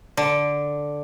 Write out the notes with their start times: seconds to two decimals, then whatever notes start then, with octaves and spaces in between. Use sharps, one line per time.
0.17 D3